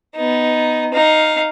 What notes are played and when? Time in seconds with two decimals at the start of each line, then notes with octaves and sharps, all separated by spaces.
0.15 B3 D#4
0.93 D#4 F5